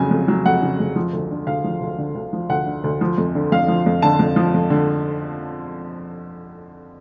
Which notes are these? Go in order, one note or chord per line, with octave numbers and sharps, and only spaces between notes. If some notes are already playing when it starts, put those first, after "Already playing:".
Already playing: F2 C#3 F#3 G#5
F2
F#3
F2 F#5
C#3
F2
F3
D2
D3
D2 F5
F3
D2
D3
D2
F3
D2 F#5
D3
D2
F3
F2
D3
F2 F5
F3
F2
D3 A5
F2
F3
F2
D3